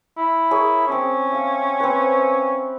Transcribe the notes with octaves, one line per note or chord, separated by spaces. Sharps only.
E4
G#4 A#4 C#5
C4 C#4 A5 D6
E5 F5
C4 B4